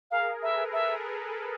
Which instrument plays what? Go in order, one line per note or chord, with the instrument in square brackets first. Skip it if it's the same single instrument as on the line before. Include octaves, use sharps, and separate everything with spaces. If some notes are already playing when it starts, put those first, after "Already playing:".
[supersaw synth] G#4 A#4 [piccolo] F5
[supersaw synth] A4 B4 [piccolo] E5
[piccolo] E5